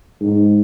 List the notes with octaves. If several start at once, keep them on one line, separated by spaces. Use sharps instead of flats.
G#2